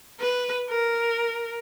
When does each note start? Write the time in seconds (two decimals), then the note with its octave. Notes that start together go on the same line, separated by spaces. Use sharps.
0.20 B4
0.69 A#4